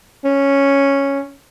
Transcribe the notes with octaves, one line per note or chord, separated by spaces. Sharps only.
C#4